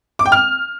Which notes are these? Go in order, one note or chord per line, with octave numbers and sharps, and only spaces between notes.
D6
G5
F6